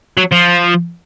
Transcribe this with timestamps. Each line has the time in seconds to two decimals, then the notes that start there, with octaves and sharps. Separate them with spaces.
0.17 F#3
0.32 F3